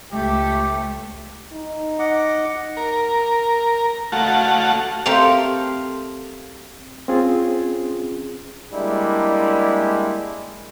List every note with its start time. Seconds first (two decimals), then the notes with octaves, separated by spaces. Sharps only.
0.12 C#2 A3 G4
1.53 D#4
1.99 D#5 F#5 D6
2.77 A#4
4.12 A3 F#4 F5 F#5 A5
5.06 A3 C4 G4 A#4 F5
7.08 C4 C#4 F4 G#4
8.73 G3 G#3 A#3 D4 E4